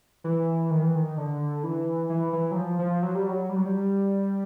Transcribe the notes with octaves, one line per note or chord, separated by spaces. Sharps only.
E3
D#3
E3
D#3
D3
E3
E3
E3
F#3
F3
F3
F#3
G3
F#3
G3
F#3
G3